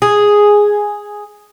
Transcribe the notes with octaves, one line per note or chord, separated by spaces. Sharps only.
G#4